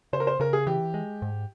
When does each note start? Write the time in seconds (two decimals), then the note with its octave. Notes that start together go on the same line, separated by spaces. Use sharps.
0.13 C#3 C5
0.20 A#4
0.27 C5
0.40 C#3 A#4
0.53 G#4
0.67 E3 G4
0.94 G#3
1.22 G#2